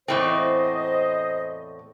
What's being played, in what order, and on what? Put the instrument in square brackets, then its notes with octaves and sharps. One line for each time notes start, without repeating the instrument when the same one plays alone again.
[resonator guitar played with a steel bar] E2 A2 C4 [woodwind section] C5 D#5